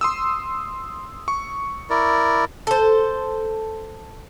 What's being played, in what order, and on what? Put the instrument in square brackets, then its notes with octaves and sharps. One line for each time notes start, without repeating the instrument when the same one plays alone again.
[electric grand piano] C6 D#6 E6
C#6
[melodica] E4 A#4 D5
[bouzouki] A4 C5